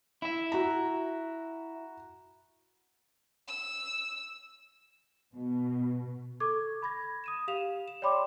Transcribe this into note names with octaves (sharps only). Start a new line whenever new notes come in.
E4 E5
F#4 A#5
E6
B2
A4 C#6 D6 G#6
B5 G#6 A#6
D#6 D#7 E7
G4 F5 E7 F7
E7
C#5 D5 G5 B5 C6 D6